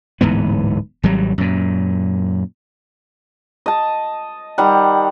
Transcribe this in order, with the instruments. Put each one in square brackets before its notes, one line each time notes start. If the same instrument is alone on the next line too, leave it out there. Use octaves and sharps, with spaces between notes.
[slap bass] D1 G#2 E3 B3
G#1 F#3 G3
F#2 A#2
[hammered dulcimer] D#5 A5
D#3 G3 F#5